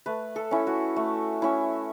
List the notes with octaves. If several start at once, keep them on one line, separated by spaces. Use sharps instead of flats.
A3 B4
A4
C#4 E4
F#4
A3
C#4 E4